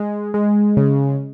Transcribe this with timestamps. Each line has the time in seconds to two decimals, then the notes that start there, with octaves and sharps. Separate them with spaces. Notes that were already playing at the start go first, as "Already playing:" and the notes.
Already playing: G#3
0.34 G#3
0.77 C#3